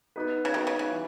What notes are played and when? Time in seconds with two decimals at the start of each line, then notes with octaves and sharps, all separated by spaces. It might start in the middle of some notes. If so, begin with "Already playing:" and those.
0.16 B3 D#4 F#4 B4
0.45 C#3
0.54 D#3 B3 D#4 F#4 B4
0.67 C#3
0.79 C#3
0.92 E3